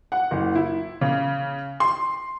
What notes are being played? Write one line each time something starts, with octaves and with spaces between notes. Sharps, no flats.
F#5
F#1
E4
C#3
C6